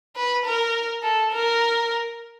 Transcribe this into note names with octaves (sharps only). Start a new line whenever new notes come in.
B4
A#4
A4
A#4